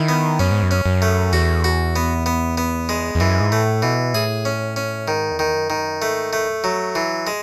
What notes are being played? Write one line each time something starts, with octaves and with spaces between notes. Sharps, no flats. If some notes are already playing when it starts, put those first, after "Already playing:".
Already playing: D#3 E4
B3
F#2 C#4
G#2
F#2
C#4
F#2
A3
E2 F#4
F#4
B3
B3
B3
G#3
E2
F#2 E3
G#2
A2 A3
B2 E3
A2 G#4
C#4
C#4
G#2 D#3
E2
D#3
F#2
G#2 D#3
F#2
G#2 A3
A3
E2
F#2
F#3
E3
G#3